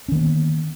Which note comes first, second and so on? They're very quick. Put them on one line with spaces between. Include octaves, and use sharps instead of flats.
C#4 D#3 A#3 B3